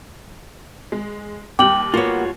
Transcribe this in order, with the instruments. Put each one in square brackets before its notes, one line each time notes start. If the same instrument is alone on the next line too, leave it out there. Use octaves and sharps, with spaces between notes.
[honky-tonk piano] G#3
[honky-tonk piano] D#2 G3 [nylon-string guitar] G5 [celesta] D6 F#7
[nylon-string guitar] A#3 B3 [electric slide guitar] F4 F#4 C#5